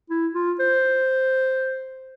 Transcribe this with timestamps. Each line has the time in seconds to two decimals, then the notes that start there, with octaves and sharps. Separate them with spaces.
0.10 E4
0.34 F4
0.60 C5